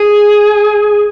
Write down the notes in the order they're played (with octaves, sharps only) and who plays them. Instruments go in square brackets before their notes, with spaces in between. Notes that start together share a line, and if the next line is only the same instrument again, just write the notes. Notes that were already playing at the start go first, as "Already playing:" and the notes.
Already playing: [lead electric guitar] G#4